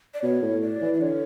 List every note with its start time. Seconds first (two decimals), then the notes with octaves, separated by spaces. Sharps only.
0.14 D5
0.23 B2 C#5
0.42 A2
0.62 D5
0.82 E3
0.94 D5
1.01 D3 C#5